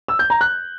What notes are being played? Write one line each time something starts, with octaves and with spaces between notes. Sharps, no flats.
E6
G6
A#5
F#6